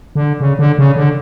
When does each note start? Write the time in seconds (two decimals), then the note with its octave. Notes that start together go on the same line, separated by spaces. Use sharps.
0.15 D3
0.41 C#3
0.59 D3
0.79 C#3
0.96 D3